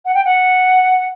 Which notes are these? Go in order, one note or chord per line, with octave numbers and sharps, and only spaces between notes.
F#5
G5
F#5